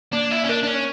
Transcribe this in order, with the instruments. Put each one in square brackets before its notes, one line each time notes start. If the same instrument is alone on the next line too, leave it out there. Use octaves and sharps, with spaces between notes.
[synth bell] A#3 [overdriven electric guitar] D4
[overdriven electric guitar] E4
C#4
[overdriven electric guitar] D4 [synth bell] A#4
[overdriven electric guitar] D4
C#4